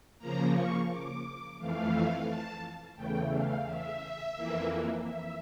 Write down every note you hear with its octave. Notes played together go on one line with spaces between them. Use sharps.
C#3 F3 A#3 A#5
C#6
D6
F2 E3 A3 F5
A5
E2 C#3 E3 A3 G5
F5
E5
F2 E3 A#3
E5